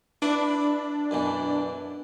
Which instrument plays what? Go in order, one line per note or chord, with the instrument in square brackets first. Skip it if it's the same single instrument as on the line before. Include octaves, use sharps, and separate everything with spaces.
[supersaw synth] D4 [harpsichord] E4 B4 D6
[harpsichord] F#2 B2 E3